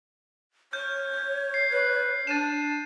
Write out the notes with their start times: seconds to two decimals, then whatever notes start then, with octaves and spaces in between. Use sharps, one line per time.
0.73 C#5 F6 G6
1.54 C7
1.73 B4 C7
2.27 D4 A6 D#7 E7